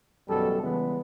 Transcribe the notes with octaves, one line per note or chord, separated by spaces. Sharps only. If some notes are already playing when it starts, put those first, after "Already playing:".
A1 F#2 B2 G3 A4
C#3 E3 G3 G#3 B3